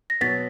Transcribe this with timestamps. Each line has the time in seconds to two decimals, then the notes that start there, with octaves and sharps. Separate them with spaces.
0.10 A#6
0.21 B2 F#3 B3 A6 B6